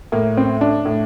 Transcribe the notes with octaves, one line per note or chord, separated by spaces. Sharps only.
A2 A#3
C4
D4
A2